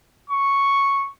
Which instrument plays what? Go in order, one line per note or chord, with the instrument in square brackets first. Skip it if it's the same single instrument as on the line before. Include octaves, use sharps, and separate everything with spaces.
[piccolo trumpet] C#6